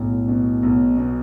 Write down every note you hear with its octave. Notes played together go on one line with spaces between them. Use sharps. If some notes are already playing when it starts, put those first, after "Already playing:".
Already playing: B1 A2
B2
B1
B2